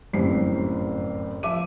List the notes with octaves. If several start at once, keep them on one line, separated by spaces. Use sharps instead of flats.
G1 F#2 A2 C4 G4 C7
F3 E5 D6 D#7